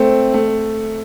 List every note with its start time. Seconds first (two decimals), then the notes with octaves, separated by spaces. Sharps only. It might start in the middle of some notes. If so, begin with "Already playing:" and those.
Already playing: A3 C4
0.34 A3